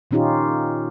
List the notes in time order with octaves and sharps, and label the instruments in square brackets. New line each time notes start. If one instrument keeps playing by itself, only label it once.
[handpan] A#2 D#3 C#4 D#4 F4 G4